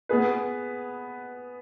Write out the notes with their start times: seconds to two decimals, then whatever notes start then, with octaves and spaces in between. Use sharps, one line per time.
0.09 B3 G#4 B4